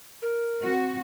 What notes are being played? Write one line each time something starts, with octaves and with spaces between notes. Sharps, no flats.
A#4
C4 F#4